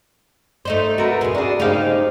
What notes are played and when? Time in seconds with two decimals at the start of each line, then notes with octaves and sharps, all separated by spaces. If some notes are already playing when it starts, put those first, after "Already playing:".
0.65 A3 D#4 C5
0.98 A3 F#4 A#4 B4
1.21 F2 B2 G#4
1.35 D4 F#4 G#4
1.60 C#3 G#3 A3 D#4 G4 G#4 C5 F5